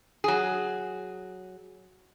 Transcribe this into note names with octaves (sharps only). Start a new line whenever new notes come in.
F#3 G#4